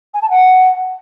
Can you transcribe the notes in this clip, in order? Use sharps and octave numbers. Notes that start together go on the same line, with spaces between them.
G#5
A5
F#5